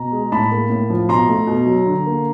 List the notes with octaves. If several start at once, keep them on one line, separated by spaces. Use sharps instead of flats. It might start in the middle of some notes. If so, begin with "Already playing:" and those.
Already playing: B2 A#5
G#3
A2 A5 B5
A#3
A2
F3
B2 A#5 C6
A3
B2
F#3
D3
A#3